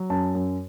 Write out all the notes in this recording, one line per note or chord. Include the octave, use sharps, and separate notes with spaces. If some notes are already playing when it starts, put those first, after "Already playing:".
Already playing: F#3
F#2 A5
F#2